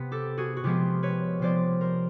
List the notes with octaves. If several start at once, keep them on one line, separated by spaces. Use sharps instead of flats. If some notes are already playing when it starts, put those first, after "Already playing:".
Already playing: C3 B3
G4 A4
F#4 G#4
F#4
C3 F3 G#3 B3 F4 G4
B4 C#5
C3 F3 G#3 B3 C5 D5
A#4 C5